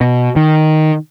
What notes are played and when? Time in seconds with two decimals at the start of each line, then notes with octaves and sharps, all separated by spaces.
0.01 B2
0.36 D#3